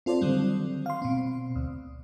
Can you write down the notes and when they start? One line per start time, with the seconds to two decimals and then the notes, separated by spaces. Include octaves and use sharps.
0.06 C4 F4 A4 C5 D5
0.21 D3 D#3 F#3 G3 C4
0.86 F5 C6
1.02 B2 C4
1.56 D2